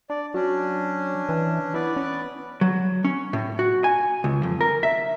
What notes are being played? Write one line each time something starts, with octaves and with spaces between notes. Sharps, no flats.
D4 D5
F#3 C#4 D4
E3
B3 E4 B4 D5
C#4
F#3
C#4
A2
F#4
G#5
C#2
F2
A#4
E5